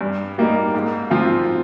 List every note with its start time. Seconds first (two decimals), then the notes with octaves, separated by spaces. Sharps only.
0.01 G2
0.38 G3 A#3 D#4
0.75 G#2
1.10 F3 C4 F4